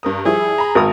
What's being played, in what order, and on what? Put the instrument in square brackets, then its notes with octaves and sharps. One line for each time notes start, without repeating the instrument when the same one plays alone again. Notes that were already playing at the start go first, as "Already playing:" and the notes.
[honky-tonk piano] G2 A#4 D#6
[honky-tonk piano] F3 G3 E4 [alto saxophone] G#4
[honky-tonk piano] A#5 B5
[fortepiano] G#1 A#4 D#6